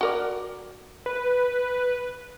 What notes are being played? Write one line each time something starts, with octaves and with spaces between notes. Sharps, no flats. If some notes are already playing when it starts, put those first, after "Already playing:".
F#4 A#4 D5
B4